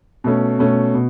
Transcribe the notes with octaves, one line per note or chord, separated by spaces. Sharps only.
B2 A3 C#4
B2 A3 C#4
B2